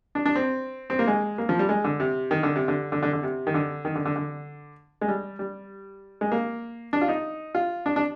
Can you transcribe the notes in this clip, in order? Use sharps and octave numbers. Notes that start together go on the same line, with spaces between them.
D4
D4
C4
C4
A#3
G#3
A#3
F3
G3
G#3
D3
C3
D#3
D3
C3
D3
D3
D3
D3
C3
D#3
D3
D#3
D3
D3
D3
G#3
G3
G3
G#3
A#3
D4
F4
D#4
F4
D4
D4